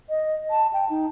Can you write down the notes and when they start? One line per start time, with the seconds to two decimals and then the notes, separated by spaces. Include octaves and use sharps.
0.09 D#5
0.51 A5
0.73 G5
0.90 D#4